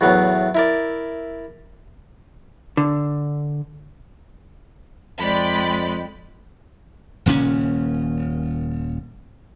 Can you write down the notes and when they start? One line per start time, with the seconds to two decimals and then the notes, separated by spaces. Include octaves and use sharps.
0.01 E2 A2 F#3 B3
0.55 E4 A#4 D5
2.77 D3
5.20 F2 G#3 D5 G5 B5
7.26 D#1 A#2 C#3 C#4